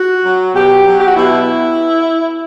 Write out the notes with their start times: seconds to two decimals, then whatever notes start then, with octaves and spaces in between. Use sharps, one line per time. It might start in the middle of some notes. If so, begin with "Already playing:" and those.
Already playing: F#4
0.23 F#3
0.54 B2 G4
0.85 F#3
1.00 G4
1.07 F#4
1.15 B2 E4